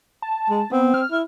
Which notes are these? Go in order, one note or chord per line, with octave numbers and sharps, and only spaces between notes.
A5
G#3
B3 C4
F6
E4